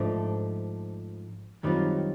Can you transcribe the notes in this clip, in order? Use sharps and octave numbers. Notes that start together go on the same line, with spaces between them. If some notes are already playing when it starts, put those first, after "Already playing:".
Already playing: G#2 F3 A3 D4
F#2 D#3 G3 C4 F4